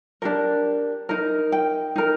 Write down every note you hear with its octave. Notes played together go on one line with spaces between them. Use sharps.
D4 G4 A#4
D#4 A#4
G5
D#4 A#4